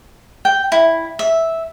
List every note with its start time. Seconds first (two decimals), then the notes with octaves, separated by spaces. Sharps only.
0.45 G5
0.72 E4
1.19 E5